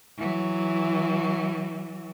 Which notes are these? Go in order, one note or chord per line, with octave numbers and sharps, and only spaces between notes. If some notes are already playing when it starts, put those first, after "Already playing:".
E3 F#3